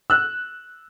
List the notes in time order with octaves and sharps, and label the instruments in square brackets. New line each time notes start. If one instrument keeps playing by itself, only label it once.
[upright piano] E6 F#6